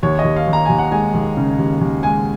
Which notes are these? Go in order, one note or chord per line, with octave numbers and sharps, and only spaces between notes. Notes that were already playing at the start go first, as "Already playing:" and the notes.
D#2 C#5
D#5
D#2
F5
D#2
A#5
D#2 G#5
F#5
G#3 G#5
D#2
C#3
D#2
D#2
G#3 G#5